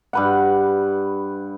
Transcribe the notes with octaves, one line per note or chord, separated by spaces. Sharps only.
G2 B4 F#5